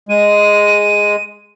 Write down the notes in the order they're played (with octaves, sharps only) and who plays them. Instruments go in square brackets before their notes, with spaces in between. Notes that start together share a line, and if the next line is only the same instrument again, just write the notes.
[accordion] G#3 [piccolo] D#7